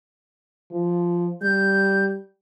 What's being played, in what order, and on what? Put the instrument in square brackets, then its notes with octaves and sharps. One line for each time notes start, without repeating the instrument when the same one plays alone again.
[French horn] F3
[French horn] G3 [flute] G6